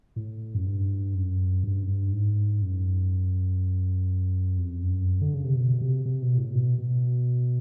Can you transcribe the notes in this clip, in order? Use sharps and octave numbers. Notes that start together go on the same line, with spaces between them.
A2
F#2
G2
F#2
G2
F#2
G2
G#2
F#2
F2
F#2
D3
C#3
C3
B2
C3
C3
B2
A2
B2
B2